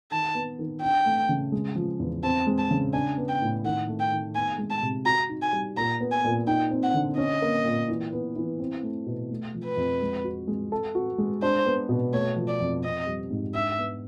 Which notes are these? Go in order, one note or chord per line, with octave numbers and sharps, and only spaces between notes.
D#3 A5
B3
D#3
D4 G5
A3
C#3
G#3
F3
E2
C4 A5
G#3
A5
C#3
D4 G#5
B3
G5
A2
D#3 F#5
A3
G5
D#3
B3 G#5
G#3
A5
C3
F#4 A#5
D#4
G#5
G3
A#2 A#5
B3
G#5
A#2
D#4 G5
C4
F#5
D3
C#4 D#5
A#3
A#2
E3
B3
E3
C4
A3
B2
A3
F3
B4
F2
G#3
F#4
G#3
A4
F#4
G#3
D4 C5
B3
B2
A3 C#5
F3
D5
F2
C4 D#5
G3
G#2
D4 E5
B3